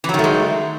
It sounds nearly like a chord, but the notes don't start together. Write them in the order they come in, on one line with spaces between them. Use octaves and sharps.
E3 F#3 D#3 A3 G#3